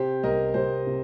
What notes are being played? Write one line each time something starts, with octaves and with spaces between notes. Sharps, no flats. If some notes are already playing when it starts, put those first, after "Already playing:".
Already playing: C3 G4 C5
C2 A#4 D#5
C2 G4 C5
C3